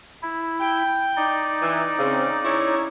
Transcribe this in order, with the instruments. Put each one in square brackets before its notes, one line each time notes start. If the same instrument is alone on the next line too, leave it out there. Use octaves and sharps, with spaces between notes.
[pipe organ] E4
[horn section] G5
[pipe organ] D#4 D5
[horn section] E3
C#3 C4
C#4 E4 C#5